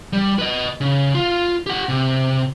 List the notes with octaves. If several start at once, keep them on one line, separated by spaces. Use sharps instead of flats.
G3
B4 D#5
C#3
F4
G4 F#5
C3